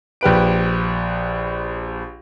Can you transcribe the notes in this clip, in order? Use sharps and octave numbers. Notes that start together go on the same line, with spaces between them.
A#1 G4 B4 D7